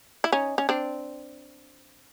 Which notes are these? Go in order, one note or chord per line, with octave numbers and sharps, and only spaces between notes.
E4
C#4 D#4
C#4
C4 D4